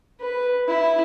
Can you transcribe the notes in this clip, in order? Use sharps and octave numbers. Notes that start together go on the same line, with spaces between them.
B4
E4